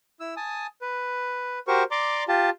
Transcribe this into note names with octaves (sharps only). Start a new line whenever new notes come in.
E4 E6
G#5 A5 D#6
B4
F#4 G4 A#4 C5 C#6
D5 A#5 C6 D6
F4 G4 A5